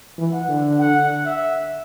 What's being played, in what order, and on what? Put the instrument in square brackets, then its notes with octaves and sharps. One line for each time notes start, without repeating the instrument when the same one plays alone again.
[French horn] E3
[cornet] F#5
[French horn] D3
[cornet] F#5
E5